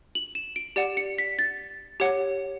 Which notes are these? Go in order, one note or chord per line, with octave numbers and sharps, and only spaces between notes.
F#7
E7
D7
G4 D5 F#5 E7
C#7
B6
A6
G4 C#5 F#5